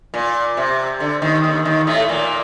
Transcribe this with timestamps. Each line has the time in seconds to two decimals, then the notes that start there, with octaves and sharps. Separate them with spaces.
0.14 A#2
0.57 C3
1.00 D3
1.22 D#2 D#3
1.44 D#2 D#3
1.65 D#2 D#3
1.87 A2 A3
2.09 A#2 A#3